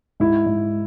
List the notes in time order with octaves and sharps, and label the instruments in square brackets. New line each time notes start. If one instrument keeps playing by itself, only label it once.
[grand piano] G#2 E4
G#2